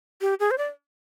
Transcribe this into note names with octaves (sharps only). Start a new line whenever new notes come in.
G4
G#4
C5
D5